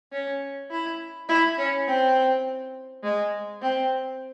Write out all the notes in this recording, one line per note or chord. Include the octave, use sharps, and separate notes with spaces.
C#4
E4
E4
C#4
C4
G#3
C4